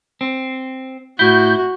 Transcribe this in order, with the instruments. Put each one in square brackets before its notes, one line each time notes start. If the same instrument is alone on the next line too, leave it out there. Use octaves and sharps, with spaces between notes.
[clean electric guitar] C4
[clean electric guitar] A2 E4 [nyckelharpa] F#4 [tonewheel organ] G6